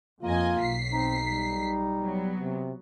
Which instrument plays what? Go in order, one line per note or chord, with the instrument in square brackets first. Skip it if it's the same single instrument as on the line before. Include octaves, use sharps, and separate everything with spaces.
[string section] F2 D#5 G#5 [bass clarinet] A#3 [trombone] F4
[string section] B1 B6 C7
[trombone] C4 [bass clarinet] D#4
[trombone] G3
[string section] F#3 B3
[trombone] C3